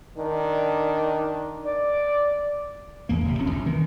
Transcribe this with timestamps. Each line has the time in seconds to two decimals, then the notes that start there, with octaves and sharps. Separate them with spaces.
0.18 D#3 D4
1.66 D5
3.09 G#1 E2 A#3
3.25 F1 C3
3.38 D#1 F2 C#4
3.51 A#1
3.66 D#3 E3